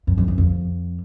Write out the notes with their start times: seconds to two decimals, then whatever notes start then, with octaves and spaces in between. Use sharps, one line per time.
0.07 F#2
0.18 F2
0.28 E2
0.38 F2